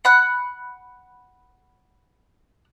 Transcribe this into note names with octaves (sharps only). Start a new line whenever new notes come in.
F#5 B5 F#6